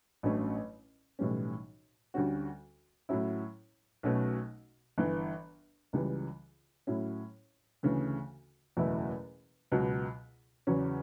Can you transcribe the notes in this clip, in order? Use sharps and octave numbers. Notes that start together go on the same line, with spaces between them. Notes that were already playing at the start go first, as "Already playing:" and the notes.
A1 G2 F#3 A3 C#4
B1 A2 E3 G3 C#4
D2 D3 G3 C#4 F#4
A2 F#3 C#4 E4
B1 B2 A3 C#4
G1 G2 E3
C#2 C#3 E3 G3
A2 F#3 C#4 E4
D2 C#3 E3 A3
F#1 E2 B2 A3 E4
C#2 B2 F#3
E2 C#3 F#3 C#4